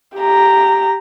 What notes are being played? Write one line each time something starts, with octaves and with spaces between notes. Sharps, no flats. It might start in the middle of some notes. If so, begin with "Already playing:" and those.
G4 A#5